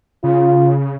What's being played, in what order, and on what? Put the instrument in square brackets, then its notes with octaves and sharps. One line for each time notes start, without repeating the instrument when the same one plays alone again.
[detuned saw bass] C#3 [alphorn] F4